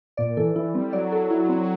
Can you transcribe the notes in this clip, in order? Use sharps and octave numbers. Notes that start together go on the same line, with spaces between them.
A#2 D5
E3 A4
E3 E4
G3 C4
F#3 D5
A4
E4
C4